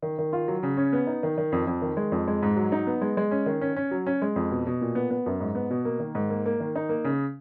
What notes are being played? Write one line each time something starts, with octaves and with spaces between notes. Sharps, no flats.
D#3
D#3
F4
F#3
C#3
C#4
B3
D#4
D#3
D#3
F2
F2
D#3
G#3
F2
G#3
G#2
F#3
D#4
B3
G#3
G#3
C#4
D#3
C#4
C#4
F#3
C#4
G#3
F2
B2
B2
A#2
B3
B3
F#2
G#2
B3
B2
A#3
D#3
G#2
A#3
A#3
D#3
D#4
A#3
C#3